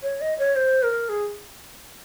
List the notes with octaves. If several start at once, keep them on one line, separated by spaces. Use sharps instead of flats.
C#5
D#5
C#5
C5
A#4
G#4